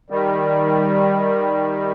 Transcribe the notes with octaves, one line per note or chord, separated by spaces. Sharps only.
D#3 G3